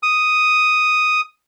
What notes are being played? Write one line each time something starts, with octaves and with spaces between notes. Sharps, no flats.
D#6